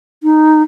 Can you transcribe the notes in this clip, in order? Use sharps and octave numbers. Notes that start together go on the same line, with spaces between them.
D#4